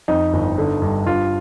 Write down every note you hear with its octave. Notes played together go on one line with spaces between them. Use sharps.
F2 D#4
G1
D3
G2
G2 F4